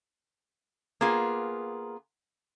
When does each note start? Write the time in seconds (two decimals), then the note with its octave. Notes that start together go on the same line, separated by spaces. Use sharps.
1.01 A#3 B3 F4 G#4